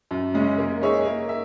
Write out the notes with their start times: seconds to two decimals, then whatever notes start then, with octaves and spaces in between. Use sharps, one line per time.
0.11 F#2
0.33 C#3 G#3 C#4
0.58 A#3
0.82 D#4 G#4 C#5 E5
1.05 A#3
1.29 E5